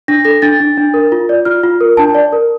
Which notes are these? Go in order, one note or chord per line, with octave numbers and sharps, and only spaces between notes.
D4 A#6
A4 A#6
D4 A6
D4
D4
A#4
F4
D5
F4 F6
F4
A#4
D4 A5
D5
A#4